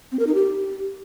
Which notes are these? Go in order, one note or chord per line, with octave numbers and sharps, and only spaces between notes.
C4
A#4
D#4
G4